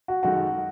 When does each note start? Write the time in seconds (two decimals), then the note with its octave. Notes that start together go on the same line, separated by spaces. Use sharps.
0.08 F#4
0.23 F#2 D#3 G#3 D#4 F#4 A4